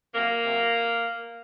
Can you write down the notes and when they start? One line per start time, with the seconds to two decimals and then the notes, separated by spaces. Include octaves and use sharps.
0.14 C3 F#3 A#3
0.44 C3 F#3